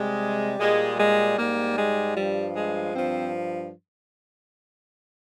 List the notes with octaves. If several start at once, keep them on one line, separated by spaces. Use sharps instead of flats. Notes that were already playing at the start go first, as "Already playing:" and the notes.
Already playing: C3 G3 G#3
A#2 G3 G#3
G#3
G#2 G3 A#3
G#3
G2 F3 G3
G#3
G2 F3 C4